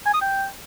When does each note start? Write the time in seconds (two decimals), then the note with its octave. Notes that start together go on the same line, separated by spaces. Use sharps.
0.06 G#5
0.14 D#6
0.22 G5